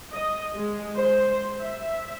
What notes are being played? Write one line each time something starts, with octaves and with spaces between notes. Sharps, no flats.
D#5
G#3
C5
E5